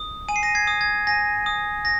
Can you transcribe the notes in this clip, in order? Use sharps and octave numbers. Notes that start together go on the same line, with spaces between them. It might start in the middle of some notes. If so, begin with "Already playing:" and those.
Already playing: D#6
G#5 D#7
C7
A#6 D#7
G#6 C7
D#6
G#6
G#5 A#6
D#6
A#6